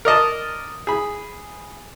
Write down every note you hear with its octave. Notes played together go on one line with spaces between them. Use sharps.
A#4 D5 D#5 A5
G#4 B5